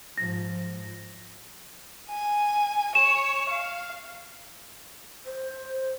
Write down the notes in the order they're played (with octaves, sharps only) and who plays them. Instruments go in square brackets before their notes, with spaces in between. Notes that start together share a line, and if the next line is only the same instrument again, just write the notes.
[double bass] G#2 F3 [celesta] A#6
[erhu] G#5
[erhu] C#5 [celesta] E7
[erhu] F5
[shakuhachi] C5